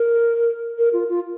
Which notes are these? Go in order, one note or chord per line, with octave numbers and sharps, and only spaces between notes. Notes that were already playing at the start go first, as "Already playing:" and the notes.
Already playing: A#4
A#4
F4
F4